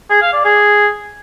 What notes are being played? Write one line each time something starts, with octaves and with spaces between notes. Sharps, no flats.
G#4
F5
D5
G#4